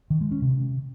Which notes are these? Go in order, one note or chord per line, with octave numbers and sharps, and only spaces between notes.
D#3
G#3
C#4
C3